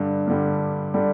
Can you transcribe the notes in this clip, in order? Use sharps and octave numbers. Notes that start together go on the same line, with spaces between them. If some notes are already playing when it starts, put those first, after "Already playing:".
Already playing: G2 D3 G3
G2 D3 G3
D3 G3